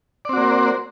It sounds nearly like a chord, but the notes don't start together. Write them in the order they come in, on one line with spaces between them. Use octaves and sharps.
D5 C4 F#4 A#3 C5